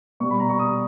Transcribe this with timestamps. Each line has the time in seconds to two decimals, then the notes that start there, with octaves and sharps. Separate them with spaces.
0.20 B2 G3 C#6
0.31 B5
0.40 A#5
0.49 C#6
0.59 D#6